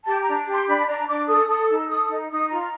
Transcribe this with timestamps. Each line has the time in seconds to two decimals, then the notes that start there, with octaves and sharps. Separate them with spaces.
0.06 G4 A5
0.22 D4 A#5
0.47 G4 C6
0.67 D4 B5
0.87 D4 A#5
1.07 D4 D6
1.28 A4 D#6
1.48 A4 D#6
1.69 D#4 E6
1.89 A4 D#6
2.09 D#4
2.31 D#4 D#6
2.50 F4 A#5